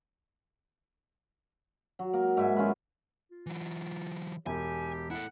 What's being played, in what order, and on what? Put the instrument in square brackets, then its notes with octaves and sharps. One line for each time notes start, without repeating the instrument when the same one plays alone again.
[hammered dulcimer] F#3
A#3
G#2 E5 G#5
F#3 C#4 F4 B4
[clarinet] F4
[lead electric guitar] E3 F#3
[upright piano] E1 [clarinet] G4 [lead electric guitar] G#5
[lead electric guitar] E4 A4 [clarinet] F#5